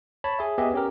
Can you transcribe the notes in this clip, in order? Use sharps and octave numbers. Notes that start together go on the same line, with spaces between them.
C#5 A5 B5
G#4 E5
B3 G4 G#4 D#5 E5
C#4 G4 A#4